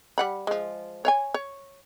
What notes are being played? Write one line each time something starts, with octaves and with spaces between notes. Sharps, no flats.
G3 F#5 B5
F3 G#3
C#5 F5 G#5
C#5